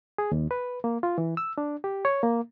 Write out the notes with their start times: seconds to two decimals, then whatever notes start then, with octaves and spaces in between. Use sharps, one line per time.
0.18 G#4
0.32 D#2
0.51 B4
0.84 A#3
1.03 F4
1.18 E3
1.37 E6
1.58 D4
1.84 G4
2.05 C#5
2.23 A#3